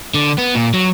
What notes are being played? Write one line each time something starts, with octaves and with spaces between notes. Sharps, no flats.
D3
B3
A#2
F#3